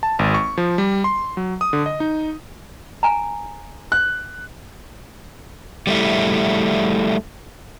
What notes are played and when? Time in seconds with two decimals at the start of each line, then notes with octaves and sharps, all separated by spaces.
0.03 A5
0.19 G#1
0.34 C#6
0.58 F3
0.78 G3
1.04 C6
1.37 F#3
1.61 D#6
1.73 D3
1.86 D#5
2.00 D#4
3.03 G#5 A#5
3.92 F#6
5.87 G3 A3 E4